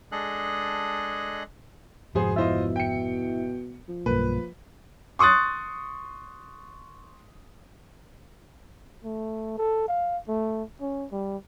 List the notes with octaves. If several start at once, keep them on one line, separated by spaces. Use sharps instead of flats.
G#3 D4 G#4 A4 D#5 F#6
F1 G#2 B2 F3 B3 G#4 C5
E4 F4 C5 D#5 E5
G5 C#7
F3
B1 G2 A#3 B4
C6 C#6 D#6 F#6 A6
A3
A4
F5
A3
C#4
G3